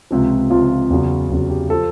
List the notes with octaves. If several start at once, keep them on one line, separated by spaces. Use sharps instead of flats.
C#2 C3 F3
C#2 C3 F3 F4
E2 C#3 F#3
E2 C#3 F#3
G4
F3 A4